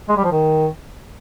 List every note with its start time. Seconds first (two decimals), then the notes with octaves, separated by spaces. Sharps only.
0.09 G#3
0.17 G3
0.24 F3
0.32 D#3